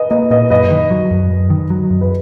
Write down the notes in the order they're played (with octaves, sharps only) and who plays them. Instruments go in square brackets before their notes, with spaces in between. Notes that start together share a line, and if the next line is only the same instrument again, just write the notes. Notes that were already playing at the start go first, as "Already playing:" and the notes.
Already playing: [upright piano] B4 D#5
[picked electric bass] A#3 [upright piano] B4 D#5
[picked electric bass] A#2 [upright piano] B4 D#5
[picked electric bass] F#2 [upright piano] B4 D#5
[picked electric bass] D#3
F#3
F#2
F#2
D#3
F#3
F#2
[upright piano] B4